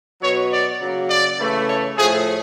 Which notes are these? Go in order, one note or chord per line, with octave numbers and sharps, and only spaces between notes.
B2 F#3 B3 C#5
D5
C#3 F#3 A#3
D5
C#3 E3 A3
C#5
A2 F3 A3 G#4